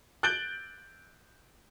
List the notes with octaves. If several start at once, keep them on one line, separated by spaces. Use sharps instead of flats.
F#6 G6 A6 D7 F#7 G7